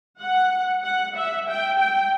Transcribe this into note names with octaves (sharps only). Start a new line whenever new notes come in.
F#5
F#5
E5
G5
G5